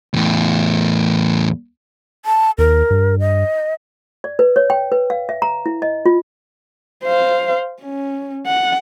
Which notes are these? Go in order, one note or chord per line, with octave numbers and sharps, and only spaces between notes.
E2 A2
A5
D#2 A#4
G2
D#5
D5
B4
C#5
G5
B4
F5
E5
A#5
E4
D#5
F4
C5 F5
C#4
F#5